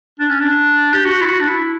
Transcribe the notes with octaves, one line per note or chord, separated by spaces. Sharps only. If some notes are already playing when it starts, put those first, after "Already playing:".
D4
C#4
D4
G4
F#4
E4
F#4
D4
E4